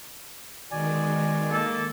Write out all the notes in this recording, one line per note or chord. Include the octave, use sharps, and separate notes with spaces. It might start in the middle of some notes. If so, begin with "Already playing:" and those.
B2 D#3 G#3 D5 G#5
A#3 A4